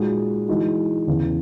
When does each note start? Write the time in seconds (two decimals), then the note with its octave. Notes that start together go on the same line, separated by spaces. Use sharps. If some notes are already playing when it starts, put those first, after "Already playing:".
Already playing: A#2 G#3 D#4 F#4
0.48 E3 G#3 D#4 F#4
1.07 E2 C#3 E3 B3